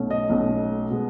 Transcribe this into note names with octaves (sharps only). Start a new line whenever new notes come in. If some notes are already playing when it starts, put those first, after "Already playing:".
Already playing: B1 B2 A3 C#4
D#5
B1 B2 A3 C#4
B2 G#3 B3